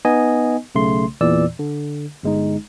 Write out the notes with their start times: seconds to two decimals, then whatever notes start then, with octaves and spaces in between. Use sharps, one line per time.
0.05 B3 D#4 D#5 G#5
0.75 B1 C#3 A3 C6
1.21 E2 A#2 E3 D5 E6
1.59 D3
2.23 G1 G#3 D#4